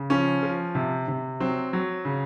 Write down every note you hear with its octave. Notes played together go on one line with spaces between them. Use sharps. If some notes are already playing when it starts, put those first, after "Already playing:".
Already playing: C#3
F3 C#4
F3
C3
C3
F#3 C4
F#3
C#3